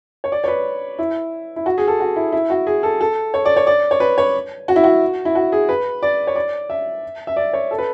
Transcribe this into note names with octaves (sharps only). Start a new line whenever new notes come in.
C#5
D5
C#5
B4
E4
E4
F#4
G#4
A4
F#4
E4
E4
F#4
G#4
A4
A4
C#5
D5
C#5
D5
C#5
B4
C#5
F#4
E4
F#4
E4
F#4
G#4
B4
D5
C#5
D5
E5
E5
D5
C#5
A4
B4